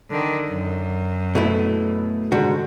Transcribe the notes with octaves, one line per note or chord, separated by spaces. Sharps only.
D3 D#3
F#2
B2 A3 E4
G#2 D3 F#4